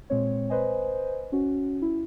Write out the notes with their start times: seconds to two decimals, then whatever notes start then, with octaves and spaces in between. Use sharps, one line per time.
0.10 A#2 G#3 C4 C#5
0.50 B4 C5 D#5 G#5
1.32 C#4 F#4
1.82 E4